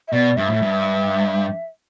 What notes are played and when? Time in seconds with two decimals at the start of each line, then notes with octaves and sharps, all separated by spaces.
0.08 E5
0.13 B2 D5
0.37 G2 E5
0.50 A2
0.62 G2